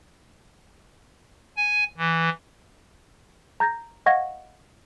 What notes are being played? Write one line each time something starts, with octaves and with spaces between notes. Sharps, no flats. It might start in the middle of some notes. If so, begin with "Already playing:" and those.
G#5
E3
A#5 G6 A6 A#6
D#5 F5 F#5 C#6 G#6 A#6